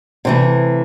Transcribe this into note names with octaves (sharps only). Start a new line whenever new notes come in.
C3 E3 A3